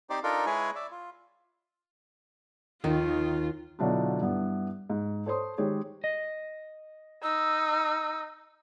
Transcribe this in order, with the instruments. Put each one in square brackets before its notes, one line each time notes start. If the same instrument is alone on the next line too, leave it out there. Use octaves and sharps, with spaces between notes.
[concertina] C4 D#4 G4 C5 D5
D4 D#4 F4 A4 A#4
G#3 E4 G#4 B4 C#5 G#5
D5 E5
F4
[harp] D#2 [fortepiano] D#3 [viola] F4
[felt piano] B2 D3 F#3 D4 E4 F4
G2 B3 E4
G#2
A4 C5 C#5 C6 D#6
D#3 G#3 G4 G#4 C#5
[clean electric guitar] D#5
[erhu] D#4 [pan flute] E6